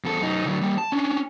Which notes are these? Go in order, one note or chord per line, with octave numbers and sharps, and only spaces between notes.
E2 A4
F#2 D#4
D3 F#3
G3 A#3
A5
C#4 D4